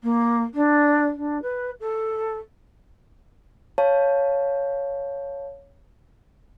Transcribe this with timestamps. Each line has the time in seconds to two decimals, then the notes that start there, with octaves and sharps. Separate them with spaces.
0.03 A#3
0.54 D4
1.16 D4
1.41 B4
1.80 A4
3.78 C#5 F5 A5